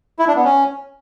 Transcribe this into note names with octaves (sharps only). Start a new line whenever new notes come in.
E4
D4
B3
C#4